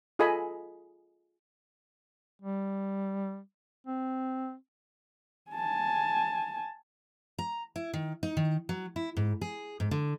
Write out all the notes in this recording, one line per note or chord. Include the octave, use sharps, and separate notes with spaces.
F4 G#4 A4 D#5 G#5 B5
G3
C4
G#5 A5
A#5
E4
D#3
D#4
D#3
F#3
E4
G#2
G#4
G#2
D3